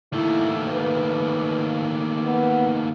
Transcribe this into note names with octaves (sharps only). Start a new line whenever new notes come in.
D#2 A3 E4
B4
B3